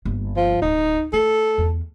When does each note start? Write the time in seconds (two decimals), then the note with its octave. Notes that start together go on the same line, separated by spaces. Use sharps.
0.05 G1 A#3
0.36 F3
0.62 D1 D#4
1.13 A3 A4
1.58 E2